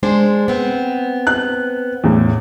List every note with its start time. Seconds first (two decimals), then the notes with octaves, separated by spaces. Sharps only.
0.03 G#3 D4 C5
0.48 B3 C4
1.27 F#6
2.04 E2 A2